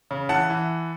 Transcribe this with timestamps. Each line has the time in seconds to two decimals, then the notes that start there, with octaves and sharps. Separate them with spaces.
0.11 C#3
0.29 E3 F#5 A5
0.50 E3